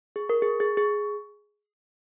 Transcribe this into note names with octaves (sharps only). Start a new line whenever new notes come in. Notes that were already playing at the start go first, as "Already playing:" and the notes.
G#4
A#4
G#4
G#4
G#4